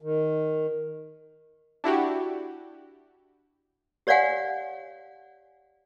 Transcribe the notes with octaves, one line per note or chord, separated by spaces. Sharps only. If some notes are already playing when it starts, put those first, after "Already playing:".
D#3
D4 E4 F#4 G4
G4 C#5 D5 F5 F#5 G#5